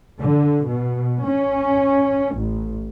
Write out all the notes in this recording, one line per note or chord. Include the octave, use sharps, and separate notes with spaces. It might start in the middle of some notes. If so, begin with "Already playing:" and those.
D3
B2
C#4
A1